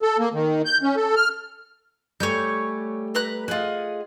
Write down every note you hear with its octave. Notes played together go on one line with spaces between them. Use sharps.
A4
A#3
D#3
G6
C#4
A4
F6
G3 A3 G4 C#5 G#5 G6
B4 A#5 F#6
F4 G#4 D#5 F#5